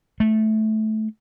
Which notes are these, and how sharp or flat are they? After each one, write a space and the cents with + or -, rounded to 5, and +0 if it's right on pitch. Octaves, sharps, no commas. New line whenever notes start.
A3 -15